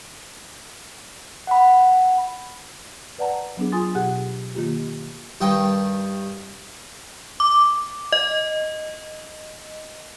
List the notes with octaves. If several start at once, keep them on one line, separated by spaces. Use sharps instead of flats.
F#5 B5
B4 D5 F#5 A5 A#5
F#3 B3 D4 G#4
F4 G#4 G#5 C6 D#6 A6
B2 G4 G#4 F#5 F#6
D#3 A#3 F4 G4
G2 D#3 D#5 G5
D6
D#5